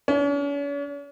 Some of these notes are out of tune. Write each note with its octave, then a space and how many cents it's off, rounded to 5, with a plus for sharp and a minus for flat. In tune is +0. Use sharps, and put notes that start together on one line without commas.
C#4 +45